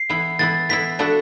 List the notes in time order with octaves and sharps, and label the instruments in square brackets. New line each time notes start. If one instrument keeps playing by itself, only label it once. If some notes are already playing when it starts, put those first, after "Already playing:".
Already playing: [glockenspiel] C7
[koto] E3 B3 E4
[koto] E3 B3 E4 [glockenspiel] A6
[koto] E3 B3 E4 [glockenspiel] B6
[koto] B3 D4 F#4 A4